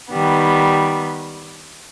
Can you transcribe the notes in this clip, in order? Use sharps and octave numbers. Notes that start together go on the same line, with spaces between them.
D#3 G3 B3